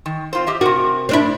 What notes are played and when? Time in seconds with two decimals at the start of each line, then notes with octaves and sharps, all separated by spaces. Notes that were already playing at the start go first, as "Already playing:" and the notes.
0.06 D#3
0.33 C4 F4 C5
0.47 G4 D#5 E5
0.61 C3 F#4 A#4
1.09 C4 D4 E4